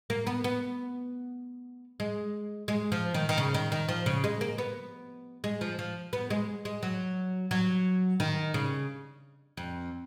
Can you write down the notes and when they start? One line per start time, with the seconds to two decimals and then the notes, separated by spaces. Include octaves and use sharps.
0.10 A#3
0.27 B3
0.44 B3
2.00 G#3
2.68 G#3
2.92 F3
3.14 D#3
3.29 D#3
3.38 C#3
3.54 D#3
3.72 D#3
3.89 F3
4.06 C#3
4.24 G#3
4.41 A#3
4.58 B3
5.44 G#3
5.61 F3
5.79 F3
6.13 B3
6.30 G#3
6.65 G#3
6.83 F#3
7.51 F#3
8.20 D#3
8.54 C#3
9.57 F2